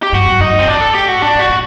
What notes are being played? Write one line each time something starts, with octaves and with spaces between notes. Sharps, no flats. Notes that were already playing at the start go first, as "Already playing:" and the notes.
G4
G2 F#4
F#2
F#2 D#4
G2
C4
A2 D4
A4
G4
F#4
A#2 D4
A2 F#4
A#2